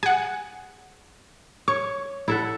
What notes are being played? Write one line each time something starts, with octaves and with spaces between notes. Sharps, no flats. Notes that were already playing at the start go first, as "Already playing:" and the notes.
G#4 F#5 G#5
C#5 C#6
E4 A4 F#5